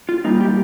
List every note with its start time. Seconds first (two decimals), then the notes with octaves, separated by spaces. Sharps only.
0.09 F4
0.24 A#2 G3 A#3 D#4
0.41 G4